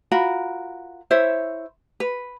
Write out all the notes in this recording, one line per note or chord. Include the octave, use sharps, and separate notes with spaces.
F4 F#4 A#4 B5
E4 C5 C#5 E5
B4